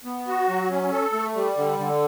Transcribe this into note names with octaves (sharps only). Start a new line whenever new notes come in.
B3
F#4
F#3
C#4
A4
A3
G3
D3
D3